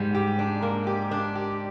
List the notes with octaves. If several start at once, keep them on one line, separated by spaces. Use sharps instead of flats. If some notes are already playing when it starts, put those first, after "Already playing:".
Already playing: G#2 G3
G4
D4
A#3
G4
D4
G4